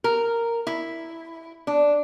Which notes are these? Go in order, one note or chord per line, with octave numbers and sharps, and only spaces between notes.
A#4
E4
D4